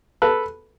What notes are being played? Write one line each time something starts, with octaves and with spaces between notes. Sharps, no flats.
A4 B4